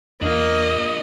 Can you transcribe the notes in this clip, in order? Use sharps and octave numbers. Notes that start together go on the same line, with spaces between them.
E2 A#3 D4 F4 D#5